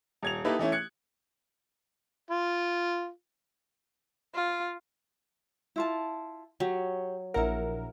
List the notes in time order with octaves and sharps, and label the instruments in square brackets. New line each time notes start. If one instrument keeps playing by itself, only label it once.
[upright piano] D#1 G#6 F7
A#3 D#4 E4 G4 A4 B4
E3 A3 C#4 E4
F#6 G#6 C#7
[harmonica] F4
[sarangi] F4
[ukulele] E4 F4 A5
[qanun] F#3 [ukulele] G4 C#5
[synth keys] A#1 A#4 [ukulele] E4 F#5